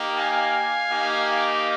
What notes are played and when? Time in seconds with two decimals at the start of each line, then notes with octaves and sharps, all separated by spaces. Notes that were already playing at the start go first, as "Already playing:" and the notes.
Already playing: A#3 D#4 G4
0.17 F5 G#5
0.90 A#3 D#4 G4